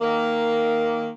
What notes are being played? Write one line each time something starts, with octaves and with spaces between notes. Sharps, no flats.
D#3 A#3